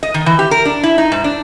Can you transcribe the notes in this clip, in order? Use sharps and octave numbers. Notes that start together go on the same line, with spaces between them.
D#5
D#3
E3
G4
A#4
D4
E4
D#4
G#2
D4